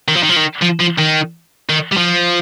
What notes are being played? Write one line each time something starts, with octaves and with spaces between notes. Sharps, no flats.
D#3
F3
D#3
F3
D#3
F3
F3
D#3
D#3
G3
F3